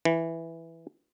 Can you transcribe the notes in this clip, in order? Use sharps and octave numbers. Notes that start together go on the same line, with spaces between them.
E3